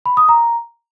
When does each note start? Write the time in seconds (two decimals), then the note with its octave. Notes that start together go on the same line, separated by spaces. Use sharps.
0.06 B5
0.17 D#6
0.29 A#5